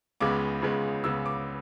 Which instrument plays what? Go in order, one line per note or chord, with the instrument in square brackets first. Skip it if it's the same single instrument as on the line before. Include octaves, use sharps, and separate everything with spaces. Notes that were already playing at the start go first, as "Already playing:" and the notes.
[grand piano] C#2 C#3 G#3 B3 D6
C#2 C#3 G#3 B3
C#2 C#3 G#3 B3 E6
D6